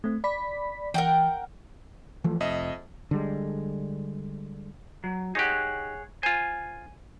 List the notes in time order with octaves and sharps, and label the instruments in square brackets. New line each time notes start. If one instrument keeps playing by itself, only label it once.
[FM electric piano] A3 C4
D5 B5 B6
[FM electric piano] E3 [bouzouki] A#4 F#5 G5
[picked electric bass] E3 F3 A3
[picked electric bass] F1 [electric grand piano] F2 D#5 E5
[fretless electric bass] D3 G3 G#3
[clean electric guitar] F#3
[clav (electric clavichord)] D#4 G4 [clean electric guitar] G#4 C#5 F#5
[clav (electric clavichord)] F4 C5 [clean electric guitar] G#5